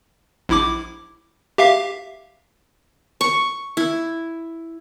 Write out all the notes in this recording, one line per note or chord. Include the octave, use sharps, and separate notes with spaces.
A#1 E4 D6
G4 E5 F5
C#6
E4